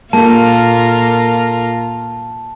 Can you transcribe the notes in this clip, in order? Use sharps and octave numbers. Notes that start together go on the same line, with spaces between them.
A#2 A#3 F4 A4 A#4 A5